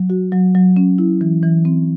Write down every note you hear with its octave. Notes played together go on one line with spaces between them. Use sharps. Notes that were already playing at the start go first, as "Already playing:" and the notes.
Already playing: F#3
F#4
F#3
F#3
C#4
E4
E3
E3
C4